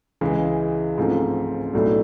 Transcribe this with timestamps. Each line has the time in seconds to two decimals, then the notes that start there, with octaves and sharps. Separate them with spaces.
0.21 C#2 C#3 E3 G#3
0.98 A1 G#2 F3 A3 C4
1.73 B1 A2 F#3 A3 D4